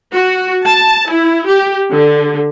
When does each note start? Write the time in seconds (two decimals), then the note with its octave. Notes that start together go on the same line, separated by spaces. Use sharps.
0.13 F#4
0.64 A5
1.10 E4
1.44 G4
1.90 D3